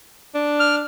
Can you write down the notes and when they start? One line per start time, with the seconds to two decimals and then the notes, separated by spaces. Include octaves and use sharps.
0.34 D4
0.60 F6